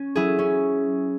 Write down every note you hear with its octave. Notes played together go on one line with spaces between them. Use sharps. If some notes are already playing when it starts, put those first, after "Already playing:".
Already playing: C#4
F#3 E4 G#4
C#4